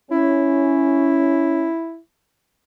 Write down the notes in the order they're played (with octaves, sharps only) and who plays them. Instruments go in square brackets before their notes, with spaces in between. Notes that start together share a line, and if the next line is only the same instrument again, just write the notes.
[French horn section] C#4 [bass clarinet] E4